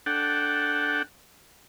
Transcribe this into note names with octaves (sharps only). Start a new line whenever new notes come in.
D4 A4 F#5 G5